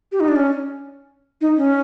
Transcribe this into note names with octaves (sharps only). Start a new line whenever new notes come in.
G4
D#4
D4
C#4
D#4
C#4